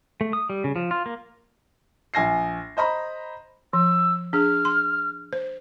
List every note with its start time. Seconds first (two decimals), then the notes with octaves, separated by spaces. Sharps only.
0.21 A3
0.33 D#6
0.50 G3
0.64 C#3
0.76 F3
0.91 F4
1.06 A#3
2.14 A#1 G#5 A#6 C7
2.77 C5 D#5 A#5 B5
3.73 F3 E6
4.33 D4 G#4 F6
4.65 C6
5.33 C5